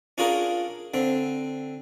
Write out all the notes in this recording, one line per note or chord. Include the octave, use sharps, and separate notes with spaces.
C#4 D4 F4 G#4 A#4
D3 C4